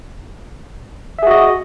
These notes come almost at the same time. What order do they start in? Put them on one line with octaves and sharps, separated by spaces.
E5 G#4 F#4 D#5